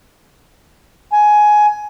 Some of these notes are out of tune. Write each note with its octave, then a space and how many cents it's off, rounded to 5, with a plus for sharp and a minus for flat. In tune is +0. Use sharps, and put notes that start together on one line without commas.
G#5 +15